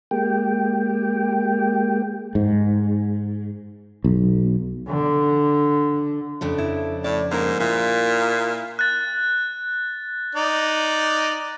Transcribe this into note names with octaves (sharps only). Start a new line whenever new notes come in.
G#3 A#3 G4 G5
G#2
B1
D3
F2 C#3 D4
E4
A2 D5
G#2 A#3 A#4
A#2 E4
F#6 A6
D#4 D5